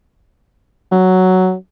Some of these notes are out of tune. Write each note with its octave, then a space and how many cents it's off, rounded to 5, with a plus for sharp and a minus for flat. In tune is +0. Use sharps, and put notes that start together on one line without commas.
F#3 +5